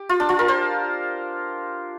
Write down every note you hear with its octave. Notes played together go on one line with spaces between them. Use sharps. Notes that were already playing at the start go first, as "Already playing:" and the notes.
Already playing: G4
F4
D4
F4
A#4
C5